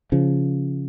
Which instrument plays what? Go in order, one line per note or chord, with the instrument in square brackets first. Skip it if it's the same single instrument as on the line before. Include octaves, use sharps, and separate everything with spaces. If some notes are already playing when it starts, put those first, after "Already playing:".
[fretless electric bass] C#3 F3